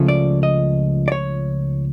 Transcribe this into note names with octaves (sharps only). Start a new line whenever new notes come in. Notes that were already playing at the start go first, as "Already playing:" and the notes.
Already playing: C#2 C#3 F3 A3 C#4
D5
D#5
D5
C#5